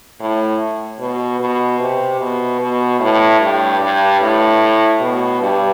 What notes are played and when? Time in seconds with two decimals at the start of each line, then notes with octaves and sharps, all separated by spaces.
0.20 A2
1.00 B2
1.40 B2
1.80 C3
2.21 B2
2.60 B2
3.00 A2
3.40 G2
3.81 G2
4.21 A2
5.00 B2
5.41 G2